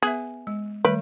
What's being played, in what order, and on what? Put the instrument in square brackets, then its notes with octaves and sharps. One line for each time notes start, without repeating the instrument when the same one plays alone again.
[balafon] B3 B4 E5 [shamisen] G#4
[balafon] G#3
[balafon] D#3 G3 A3 [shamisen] B4